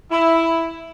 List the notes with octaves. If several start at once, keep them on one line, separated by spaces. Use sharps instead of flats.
E4